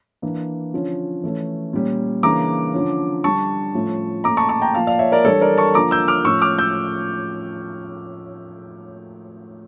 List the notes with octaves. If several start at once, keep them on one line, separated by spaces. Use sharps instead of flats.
E3 A#3 D4
D3 F3 C#4
E3 A3 C#4
A#2 G3 C#4
C#3 E3 A#3 D4 A#5 D6
D3 F3 C#4
D3 G3 D4 A5 C#6
A2 F3 A3 C#4
A#2 A3 C#4 A#5 D6
A5 C#6
A5 C#6
G5 A#5
A#2 F3 A#3 F5 A5
D5 F5
C#5 E5
A#4 D5
E3 G3 D4 A4 C#5
A#4 D5
A5 C#6
D3 F3 A#3 A#5 D6
E6 G6
D6 F6
A2 F3 C#4 C#6 E6
D6 F6
E6 G6